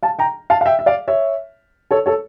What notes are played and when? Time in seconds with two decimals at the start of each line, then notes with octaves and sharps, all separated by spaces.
0.02 F5 A5
0.19 G5 A#5
0.50 F5 A5
0.61 F5
0.65 E5 G5
0.79 E5
0.86 D5 F5
1.08 C#5 E5
1.91 A4 C#5
2.06 A4 C#5